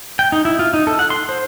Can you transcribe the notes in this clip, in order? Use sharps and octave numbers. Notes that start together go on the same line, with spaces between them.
G5
D#4
E4
F4
D#4
A4
F#5
C6
C5